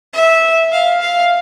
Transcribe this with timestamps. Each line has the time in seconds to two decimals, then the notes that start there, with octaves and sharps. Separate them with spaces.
0.13 E5
0.72 F5
1.01 F5